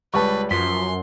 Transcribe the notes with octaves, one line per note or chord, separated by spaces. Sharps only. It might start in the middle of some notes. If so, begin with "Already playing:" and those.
C#2 G3 B4 A5 C#6
F#2 F3 C6 B6